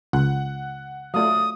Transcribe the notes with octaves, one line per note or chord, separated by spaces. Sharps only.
C#2 F#5 F#6
F#3 A3 F4 D5 F5 D#6